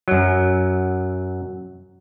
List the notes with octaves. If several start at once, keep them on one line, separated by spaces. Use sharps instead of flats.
F#2 F#3